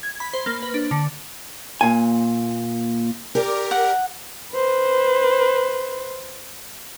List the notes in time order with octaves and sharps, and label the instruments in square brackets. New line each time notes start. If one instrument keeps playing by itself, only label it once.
[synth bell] G#6
B5
C5
A#3
B4
D4
D3
[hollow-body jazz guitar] A#2 G#5
[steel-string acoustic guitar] G4 D5 [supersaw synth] A#4
[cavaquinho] F#5
[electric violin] B4 C5